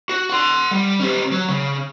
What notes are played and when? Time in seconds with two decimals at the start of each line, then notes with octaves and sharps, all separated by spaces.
0.09 F#4
0.29 F#5 C6
0.71 G3
1.00 C#4 G4
1.31 F#3
1.49 C#3